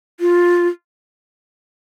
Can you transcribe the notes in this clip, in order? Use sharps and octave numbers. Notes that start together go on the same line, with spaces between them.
F4